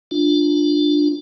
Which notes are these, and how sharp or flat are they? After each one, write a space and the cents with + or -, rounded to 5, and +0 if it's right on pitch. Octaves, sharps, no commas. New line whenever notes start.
D4 +10 F4 +10